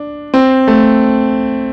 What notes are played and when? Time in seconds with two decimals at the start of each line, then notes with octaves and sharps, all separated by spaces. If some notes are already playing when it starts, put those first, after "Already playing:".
Already playing: D4
0.34 C4
0.67 A3